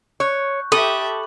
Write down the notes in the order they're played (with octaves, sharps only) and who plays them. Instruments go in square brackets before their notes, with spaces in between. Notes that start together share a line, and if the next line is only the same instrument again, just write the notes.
[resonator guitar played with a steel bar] C#5 [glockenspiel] C#6 F#6 G6
[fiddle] G4 E5 [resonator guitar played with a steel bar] A4 [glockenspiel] B5 D6 F#7 [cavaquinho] D#6